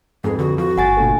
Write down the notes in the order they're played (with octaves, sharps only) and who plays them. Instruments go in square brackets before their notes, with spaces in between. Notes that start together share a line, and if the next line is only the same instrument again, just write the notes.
[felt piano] F2 B4 [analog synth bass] G#2 [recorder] G#4
[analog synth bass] D3 [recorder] F#4
[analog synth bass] F3 [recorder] F#4
[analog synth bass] G1 [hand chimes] F#5 G#5 A6
[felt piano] A#2 D3 A3